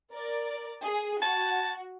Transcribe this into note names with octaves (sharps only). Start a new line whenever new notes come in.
A#4 D5
G#4
F#4 A5